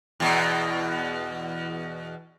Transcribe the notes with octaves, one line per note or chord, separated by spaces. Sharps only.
E2 B2